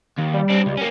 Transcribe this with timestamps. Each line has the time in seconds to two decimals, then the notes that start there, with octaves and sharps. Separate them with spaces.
0.18 D#2
0.34 G3
0.50 C4 D4
0.66 C#2
0.77 A#3 C#4